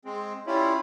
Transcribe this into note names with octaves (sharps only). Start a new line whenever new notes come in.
G#3 C4
G3 C#4 E4 F4